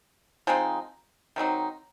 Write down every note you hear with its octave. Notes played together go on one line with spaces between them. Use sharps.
F3 G#3 C4 D#4
D#3 F#3 C4 D#4